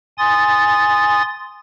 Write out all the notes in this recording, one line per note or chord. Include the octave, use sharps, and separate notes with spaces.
G#5 C6 D#6 A6